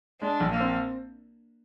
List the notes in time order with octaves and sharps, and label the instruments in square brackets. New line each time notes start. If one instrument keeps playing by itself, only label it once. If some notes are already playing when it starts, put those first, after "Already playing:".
[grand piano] G#3 [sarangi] D4
[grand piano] A#1
[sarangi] A#3
[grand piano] C4